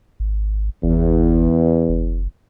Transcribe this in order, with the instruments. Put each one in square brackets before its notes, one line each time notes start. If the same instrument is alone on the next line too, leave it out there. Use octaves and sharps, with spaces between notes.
[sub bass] G#1
[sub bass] G1 [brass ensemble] E2
[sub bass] F#1